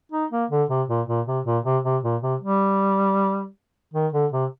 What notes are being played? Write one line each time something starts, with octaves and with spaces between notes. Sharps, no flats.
D#4
A#3
D3
C3
A#2
A#2
C3
A#2
C3
C3
A#2
C3
G3
D#3
D3
C3